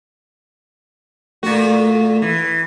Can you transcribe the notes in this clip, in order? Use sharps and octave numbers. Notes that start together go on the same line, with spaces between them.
A#2 A3 F#4
E3